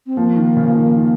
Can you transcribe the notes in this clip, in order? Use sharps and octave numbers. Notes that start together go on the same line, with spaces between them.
C4
F3 A#3
D#3
C#3
F3
D#3
D#3